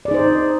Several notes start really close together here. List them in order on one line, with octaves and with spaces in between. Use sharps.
D5 G#4 D#4 C5